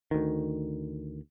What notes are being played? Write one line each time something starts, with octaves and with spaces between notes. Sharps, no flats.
D2 D#3